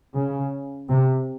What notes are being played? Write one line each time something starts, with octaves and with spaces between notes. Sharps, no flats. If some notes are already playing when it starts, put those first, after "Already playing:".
C#3
C3